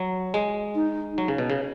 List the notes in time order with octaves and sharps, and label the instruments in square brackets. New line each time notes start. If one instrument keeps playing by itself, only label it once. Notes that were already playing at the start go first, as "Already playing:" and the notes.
Already playing: [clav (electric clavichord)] F#3
G#3
[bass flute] D#4
[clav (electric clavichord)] F#3
C#3
B2
C#3